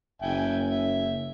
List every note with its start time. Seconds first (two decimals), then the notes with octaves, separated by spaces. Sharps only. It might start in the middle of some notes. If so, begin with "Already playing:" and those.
0.22 F#1 E5 G5 G#5
0.71 E5